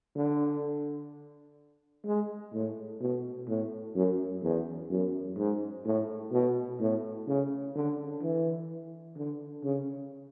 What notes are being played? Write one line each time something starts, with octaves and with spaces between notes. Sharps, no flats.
D3
G#3
A2
B2
A2
F#2
E2
F#2
G#2
A2
B2
A2
C#3
D3
E3
D3
C#3